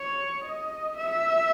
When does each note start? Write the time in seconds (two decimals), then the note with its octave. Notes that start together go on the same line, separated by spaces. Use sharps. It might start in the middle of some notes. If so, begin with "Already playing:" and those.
Already playing: C#5
0.45 D#5
0.97 E5